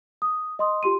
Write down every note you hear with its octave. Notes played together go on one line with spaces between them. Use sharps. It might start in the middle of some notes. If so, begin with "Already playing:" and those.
D#6
D#5 C6 D#6
F4 G4 C6 D#7